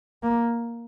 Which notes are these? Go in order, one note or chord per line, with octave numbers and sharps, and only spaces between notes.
A#3